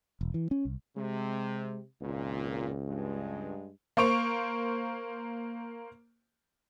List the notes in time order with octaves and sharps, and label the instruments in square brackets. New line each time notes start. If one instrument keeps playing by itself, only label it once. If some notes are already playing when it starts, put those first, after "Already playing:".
[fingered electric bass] E1
E3
C#4
C2
[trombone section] C3 [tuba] G#3
[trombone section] G#1 A#2 [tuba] C#2
[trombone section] G2 G#3
[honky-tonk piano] A#3 C5 C#6 D7 F7